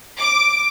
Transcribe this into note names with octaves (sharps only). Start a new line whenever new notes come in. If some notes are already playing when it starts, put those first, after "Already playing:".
D6